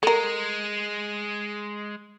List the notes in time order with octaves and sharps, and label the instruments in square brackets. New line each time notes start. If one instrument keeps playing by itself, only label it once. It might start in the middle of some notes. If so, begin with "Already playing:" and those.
[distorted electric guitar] G#3 [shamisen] A4 A#4